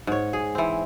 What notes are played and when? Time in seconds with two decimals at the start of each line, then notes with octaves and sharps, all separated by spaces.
0.07 G#2 C#5
0.33 G#4
0.55 E3 C4